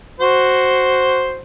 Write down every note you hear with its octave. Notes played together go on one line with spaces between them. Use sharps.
F#4 C5